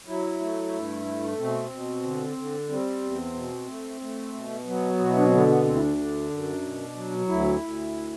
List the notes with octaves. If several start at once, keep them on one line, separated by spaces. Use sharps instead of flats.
F#3 E4
A3
G2
A3
B2 C4
B2
D3
D3
G3 C4
E2
B2
A3
A3
B2
F#3 B3
B2 F#4
E4
D4
C4
D3 B3
B3
D2 C4
E4
D4
D3
F#2
B2
F#3
D2 E4
D2